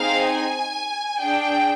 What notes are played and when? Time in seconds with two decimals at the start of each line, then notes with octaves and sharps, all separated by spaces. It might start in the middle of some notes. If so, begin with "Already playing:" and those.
Already playing: C4 D#4 G#4 F5
0.25 G#5
1.21 D4 G#4 G5